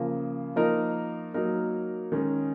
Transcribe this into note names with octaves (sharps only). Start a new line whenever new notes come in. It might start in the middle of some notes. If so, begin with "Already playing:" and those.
Already playing: C#3 F3 A#3
F3 A#3 D#4 A#4
F#3 A#3 D#4 A#4
D#3 G#3 C#4 G#4